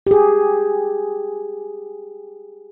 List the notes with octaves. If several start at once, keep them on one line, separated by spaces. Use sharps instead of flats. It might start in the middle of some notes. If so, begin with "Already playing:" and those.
G4 G#4